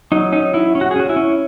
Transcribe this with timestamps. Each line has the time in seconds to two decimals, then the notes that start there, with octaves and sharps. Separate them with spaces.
0.12 F#3 D#4
0.32 C#4 D#4
0.54 F#3 E4
0.75 C#4
0.81 F#4
0.91 G#4
0.96 C#4 F#4
1.09 E4
1.16 C#4